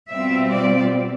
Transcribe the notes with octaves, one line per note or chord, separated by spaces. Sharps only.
B2 G3 C4 F4 E5
D5